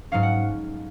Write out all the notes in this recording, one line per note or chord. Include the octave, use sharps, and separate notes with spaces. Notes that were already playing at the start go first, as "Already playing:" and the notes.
G#2 F#3 C#4 F5
F#5